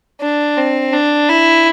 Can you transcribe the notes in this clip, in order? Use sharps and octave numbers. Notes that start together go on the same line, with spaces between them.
D4
C4
D4
E4